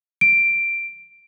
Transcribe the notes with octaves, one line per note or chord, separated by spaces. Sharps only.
D7